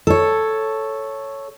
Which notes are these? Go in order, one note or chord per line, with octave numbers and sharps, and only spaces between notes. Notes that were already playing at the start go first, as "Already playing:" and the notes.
A4 C#5